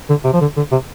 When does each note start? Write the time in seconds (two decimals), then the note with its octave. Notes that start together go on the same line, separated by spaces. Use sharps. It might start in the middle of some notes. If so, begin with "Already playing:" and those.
0.10 D3
0.24 C3
0.33 F3
0.41 D3
0.57 D3
0.72 C3